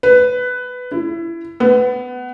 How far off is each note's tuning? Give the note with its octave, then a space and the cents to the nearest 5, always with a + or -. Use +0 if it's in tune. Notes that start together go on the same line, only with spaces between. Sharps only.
B4 +10
E4 +20
B3 +15